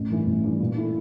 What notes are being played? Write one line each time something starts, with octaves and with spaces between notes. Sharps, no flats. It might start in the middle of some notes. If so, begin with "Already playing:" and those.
Already playing: A1
G2 E3
A1
G2 E3
A#2
A3 E4